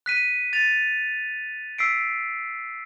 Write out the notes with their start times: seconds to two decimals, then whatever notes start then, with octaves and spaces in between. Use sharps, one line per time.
0.06 F#6 B6 D#7
0.53 A6 D#7 F7
1.78 E6 B6 C7 D7